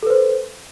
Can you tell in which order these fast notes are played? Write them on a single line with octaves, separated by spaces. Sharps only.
A4 B4 C5